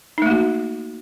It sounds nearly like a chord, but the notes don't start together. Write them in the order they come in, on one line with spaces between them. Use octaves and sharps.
D#4 A3 A#3 F#4